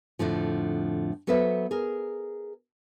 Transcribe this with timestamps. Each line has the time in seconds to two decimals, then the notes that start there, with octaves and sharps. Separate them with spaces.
0.19 F2 A2 D3 F3
1.27 F#3 B3 A4 B4 C5 E5
1.71 G#4 A#4